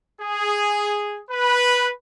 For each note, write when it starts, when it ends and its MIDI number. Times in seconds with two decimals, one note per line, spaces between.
0.22 1.21 68
1.31 1.91 71